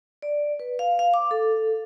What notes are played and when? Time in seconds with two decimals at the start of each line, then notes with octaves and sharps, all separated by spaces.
0.22 D5
0.60 B4
0.79 F5
0.99 F5
1.14 D6
1.31 A4